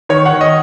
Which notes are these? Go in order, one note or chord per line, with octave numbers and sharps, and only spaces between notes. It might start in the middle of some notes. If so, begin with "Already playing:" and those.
D#3 C#5
F#5
D#3
D#5